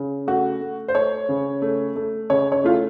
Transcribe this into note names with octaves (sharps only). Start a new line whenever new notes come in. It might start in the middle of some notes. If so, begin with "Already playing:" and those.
Already playing: C#3
A3 F#4
A3
C5
A3 C#5
C#3
A3
A3
C#3 C#5
C#5
A3 F4